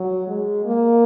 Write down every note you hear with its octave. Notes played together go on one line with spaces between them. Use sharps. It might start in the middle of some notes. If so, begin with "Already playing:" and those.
Already playing: F#3
G#3
A#3